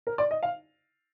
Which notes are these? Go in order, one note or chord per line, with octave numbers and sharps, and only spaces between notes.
A#4
D5
D#5
F5